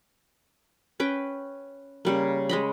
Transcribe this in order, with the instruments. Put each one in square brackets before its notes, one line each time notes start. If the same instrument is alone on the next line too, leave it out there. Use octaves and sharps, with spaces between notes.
[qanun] C#4 B4 G5
C#3 G3 A#3
G#3 D#5 B5